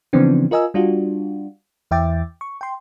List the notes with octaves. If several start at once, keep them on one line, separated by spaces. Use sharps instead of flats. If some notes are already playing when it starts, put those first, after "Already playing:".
C#3 E3 F3 B3 C4 D4
F4 A#4 D#5 G#5 E6
G3 D4 F4 F#4
E2 E3 E5 G5 D6 A6
C#6
G5 C6